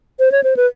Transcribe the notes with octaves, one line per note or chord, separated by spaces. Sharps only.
C5
C#5
C5
B4